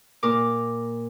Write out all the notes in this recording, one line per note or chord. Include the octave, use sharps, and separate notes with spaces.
A#2 A#4 D6